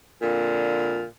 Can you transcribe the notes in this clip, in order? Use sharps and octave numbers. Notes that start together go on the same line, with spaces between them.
F2 A#2 D3